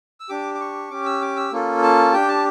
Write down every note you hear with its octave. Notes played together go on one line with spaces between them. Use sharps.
E6
D4 G4 D6
D6
C#6
C#4 G4 D6
E6
D6
E6
A#3 C#4 F4 A4
A5
D4 G4 G5
A5